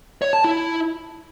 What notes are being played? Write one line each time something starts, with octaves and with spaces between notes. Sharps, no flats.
C#5
A5
E4